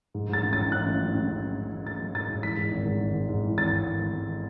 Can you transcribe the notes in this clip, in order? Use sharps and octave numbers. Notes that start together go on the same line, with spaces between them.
G#2
G#2 A6
A1
A1 A6
A1 F#6
A1
F#3
A1
A1
A1
A1
A1
A1 A6
F#3
G#2 A6
G#2
E3 B6
G#2
G#1
G#2
G#1
G#2
G#2
E3
G#1 A6
G#1
G#1
G#1
G#1